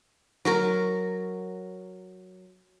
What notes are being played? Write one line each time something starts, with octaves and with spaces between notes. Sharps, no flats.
F#3 F#4 A#4